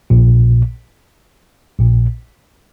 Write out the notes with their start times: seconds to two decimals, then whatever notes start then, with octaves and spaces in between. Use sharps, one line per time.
0.10 A#1 A#2
1.80 A#1 A#2